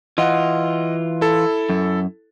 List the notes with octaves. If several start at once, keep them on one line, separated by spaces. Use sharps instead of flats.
E3 F4 D#5 F#5
E4 A4
F#2